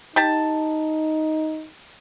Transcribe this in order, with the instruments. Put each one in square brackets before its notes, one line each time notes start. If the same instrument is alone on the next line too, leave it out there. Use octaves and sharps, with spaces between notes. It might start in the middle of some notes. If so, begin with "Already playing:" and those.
[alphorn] D#4 [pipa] G4 A5